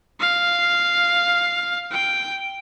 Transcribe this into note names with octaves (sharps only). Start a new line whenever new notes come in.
F5
G5